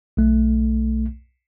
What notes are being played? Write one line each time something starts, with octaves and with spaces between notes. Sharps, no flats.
B1 A3